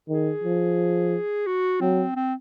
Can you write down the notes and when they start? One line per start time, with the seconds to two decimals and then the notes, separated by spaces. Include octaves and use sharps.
0.08 D#3 G#4
0.44 F3
1.47 F#4
1.81 F#3 C4
2.16 C4